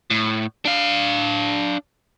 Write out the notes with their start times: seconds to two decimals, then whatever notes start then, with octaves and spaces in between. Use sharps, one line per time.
0.10 A2
0.65 D4 F5